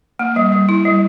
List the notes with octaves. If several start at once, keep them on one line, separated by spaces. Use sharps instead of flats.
A#3
G3
G3
E4
G3